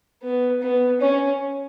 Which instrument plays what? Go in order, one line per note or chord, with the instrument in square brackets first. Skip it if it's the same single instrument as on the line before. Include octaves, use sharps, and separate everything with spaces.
[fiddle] B3
B3
[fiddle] C#4 [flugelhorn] C#5